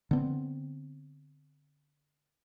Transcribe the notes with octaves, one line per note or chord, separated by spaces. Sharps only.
D3 B3 C4